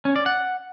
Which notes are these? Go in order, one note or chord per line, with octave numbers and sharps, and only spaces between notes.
C#4
D5
F#5